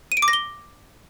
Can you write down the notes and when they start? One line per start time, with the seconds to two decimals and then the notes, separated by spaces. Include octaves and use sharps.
0.12 D#7
0.17 D7
0.22 D6
0.28 A#6
0.33 G7